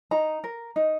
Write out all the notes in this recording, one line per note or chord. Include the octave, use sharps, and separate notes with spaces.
D#4 A#5
A#4
D#4